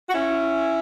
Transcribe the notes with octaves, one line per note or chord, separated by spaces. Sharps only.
F#4
C#4 E4